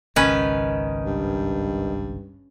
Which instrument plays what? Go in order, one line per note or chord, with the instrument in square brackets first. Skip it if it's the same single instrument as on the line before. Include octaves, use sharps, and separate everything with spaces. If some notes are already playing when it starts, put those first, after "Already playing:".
[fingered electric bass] G#1 C#2 [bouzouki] D#3 [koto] C#4 B4
[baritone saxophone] G2